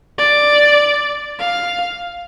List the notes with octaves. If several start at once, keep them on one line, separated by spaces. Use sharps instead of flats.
D5
F5